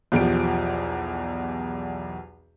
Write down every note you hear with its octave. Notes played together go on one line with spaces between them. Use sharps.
B1 E2 F3 G4 D7